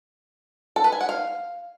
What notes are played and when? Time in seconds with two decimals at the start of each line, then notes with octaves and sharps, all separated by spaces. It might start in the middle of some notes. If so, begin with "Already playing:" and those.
0.76 A4
0.84 B4
0.92 G#5
1.01 F#5
1.09 F5